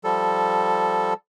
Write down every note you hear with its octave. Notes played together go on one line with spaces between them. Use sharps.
F3 G3 A4